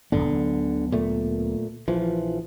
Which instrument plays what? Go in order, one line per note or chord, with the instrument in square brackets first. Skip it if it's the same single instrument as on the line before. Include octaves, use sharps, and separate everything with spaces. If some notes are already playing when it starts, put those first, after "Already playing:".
[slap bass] D1 F#2 B3 [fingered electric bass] D3
[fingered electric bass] A#2 A3
A#1 E3 F3